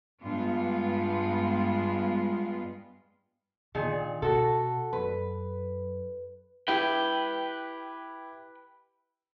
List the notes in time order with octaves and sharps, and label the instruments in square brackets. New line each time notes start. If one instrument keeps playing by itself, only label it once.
[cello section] G2 G#3 B3 F4
[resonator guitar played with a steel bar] A#2 D#3 G#4 [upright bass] D3
[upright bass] B2 [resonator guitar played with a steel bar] F#4 A4
[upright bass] F#2 [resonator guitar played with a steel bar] B4
[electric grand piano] E4 G4 [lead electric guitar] B4 G5